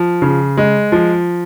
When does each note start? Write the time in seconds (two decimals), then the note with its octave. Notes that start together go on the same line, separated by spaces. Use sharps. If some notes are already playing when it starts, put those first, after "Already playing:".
Already playing: F3
0.22 C#3
0.57 G#3
0.92 F3